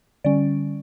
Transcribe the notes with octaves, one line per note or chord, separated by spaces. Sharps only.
D3 G3 C#4 D5